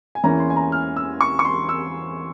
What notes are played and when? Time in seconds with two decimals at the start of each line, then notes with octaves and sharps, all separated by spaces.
0.15 G#5
0.24 E2 E3 A#3 C#4 A#5
0.40 C6
0.50 G#5
0.56 A#5
0.72 F6
0.97 E6
1.21 C#6
1.39 C#6
1.45 C6
1.69 E6